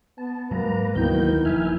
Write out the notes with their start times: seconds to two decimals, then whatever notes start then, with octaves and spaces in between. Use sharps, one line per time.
0.18 B3 A5
0.51 G#2 F#3 G#3 A#3 B4 A#5
0.95 D2 D#3 F#3 G3 A#3 B3 E4 G6
1.45 E1 F3 E5 G#5 F6